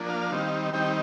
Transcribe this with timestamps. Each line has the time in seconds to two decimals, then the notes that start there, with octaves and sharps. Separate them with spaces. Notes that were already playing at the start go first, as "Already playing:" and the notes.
Already playing: F3 A#3 D4
0.10 F5
0.32 D#3 G3 C4 D#4
0.73 D#3 G3 C4 D#4 G5